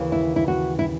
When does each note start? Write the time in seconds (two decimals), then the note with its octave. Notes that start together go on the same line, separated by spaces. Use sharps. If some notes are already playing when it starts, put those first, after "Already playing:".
Already playing: D#2 C#3 E3
0.12 E4
0.36 E4
0.48 F#4
0.79 E4